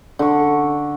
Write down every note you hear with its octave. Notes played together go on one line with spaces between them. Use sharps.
D3 C#6